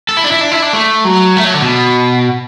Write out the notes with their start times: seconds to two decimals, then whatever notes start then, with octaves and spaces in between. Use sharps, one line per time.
0.09 A4
0.17 E4
0.24 D4
0.32 E4
0.41 D4
0.51 E4
0.62 D4
0.73 A3
1.05 F#3
1.37 A3
1.45 F#3
1.54 D3
1.62 B2